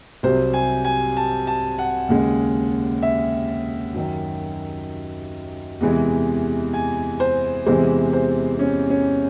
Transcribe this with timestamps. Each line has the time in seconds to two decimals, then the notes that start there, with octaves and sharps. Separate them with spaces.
0.23 C2 C3 F#3 C5
0.54 G#5
0.85 G#5
1.17 A5
1.47 A5
1.78 F#5
2.08 D#2 C#3 G#3
3.03 E5
3.94 F#2 D#3 F#3
5.81 E2 C3 E3 G#3
6.73 G#5
7.20 C5
7.66 E2 C3 E3 G#3 C5
8.13 C5
8.59 C#4
8.90 C#4